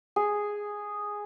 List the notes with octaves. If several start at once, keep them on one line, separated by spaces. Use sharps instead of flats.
G#4